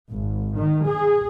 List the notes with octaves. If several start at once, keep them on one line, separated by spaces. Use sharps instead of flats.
G#1
D#3
G#4